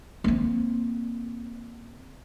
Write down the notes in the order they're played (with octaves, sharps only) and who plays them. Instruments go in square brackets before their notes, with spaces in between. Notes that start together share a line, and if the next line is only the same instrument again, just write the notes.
[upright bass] A#3 C4